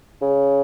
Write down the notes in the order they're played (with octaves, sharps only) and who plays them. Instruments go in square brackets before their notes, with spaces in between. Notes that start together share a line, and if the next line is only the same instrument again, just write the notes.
[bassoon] C#3